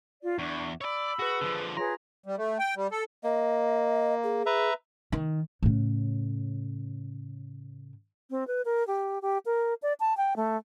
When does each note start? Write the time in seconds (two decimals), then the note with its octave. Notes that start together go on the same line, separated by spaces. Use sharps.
0.22 F4 D5
0.39 E2 D4 C#6
0.81 C#5 D5 B5 E6
1.19 F#4 G#4 B4
1.41 D3 F3
1.77 F4 G#4 B4 C#5 A#5 A#6
2.26 G3
2.37 A3
2.59 G5
2.76 G3
2.92 A4
3.23 A#3 D#5
4.24 G#4
4.46 B4 E5 A#5
5.12 D#3
5.63 A2 C#3
8.30 C4
8.47 B4
8.65 A#4
8.87 G4
9.22 G4
9.46 A#4
9.82 D5
10.00 A5
10.17 G5
10.36 A3